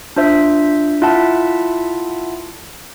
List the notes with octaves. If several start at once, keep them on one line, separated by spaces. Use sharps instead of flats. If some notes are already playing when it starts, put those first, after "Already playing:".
D4 F4 C5 E5
E4 F4 E5 F#5 A5